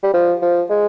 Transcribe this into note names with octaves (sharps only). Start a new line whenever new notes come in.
G3
F3
F3
G#3